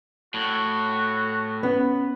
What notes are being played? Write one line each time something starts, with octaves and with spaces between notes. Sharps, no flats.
A2 F#4
B3 C#4